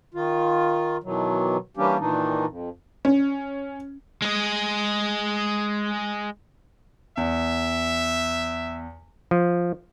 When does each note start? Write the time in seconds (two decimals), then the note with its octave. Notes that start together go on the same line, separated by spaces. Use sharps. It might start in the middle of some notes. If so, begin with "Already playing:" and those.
0.14 D#3 F4
1.03 B2 D#3 E3 F#3
1.77 E3 G3 A#3 C#4 D4 G4
1.99 A#2 D#3 E3 D4 D#4
2.47 F2
3.05 C#4
4.22 G#3 G#4
7.17 E2 E5
9.31 F3